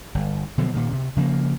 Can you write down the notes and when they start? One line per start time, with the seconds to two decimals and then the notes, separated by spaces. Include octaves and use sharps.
0.15 G1
0.58 B2 D3 F3 F#3
0.74 A#2 D#3
0.92 C3
1.17 C#3 F3 A3 A#3